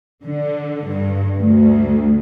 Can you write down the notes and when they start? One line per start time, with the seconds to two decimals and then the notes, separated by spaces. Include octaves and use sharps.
0.24 D3
0.85 G2
1.39 D2